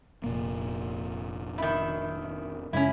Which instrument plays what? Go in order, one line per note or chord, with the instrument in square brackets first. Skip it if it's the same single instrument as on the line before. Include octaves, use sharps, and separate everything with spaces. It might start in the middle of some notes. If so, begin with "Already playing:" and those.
[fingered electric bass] F1 A#2 A#3
[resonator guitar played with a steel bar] D#3 E4
[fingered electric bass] F#2 C#3 G#3 [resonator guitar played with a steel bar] C#4 E4